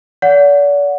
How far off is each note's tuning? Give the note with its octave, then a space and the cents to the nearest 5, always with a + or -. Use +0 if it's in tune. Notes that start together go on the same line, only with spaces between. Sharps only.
D5 -40 F#5 -15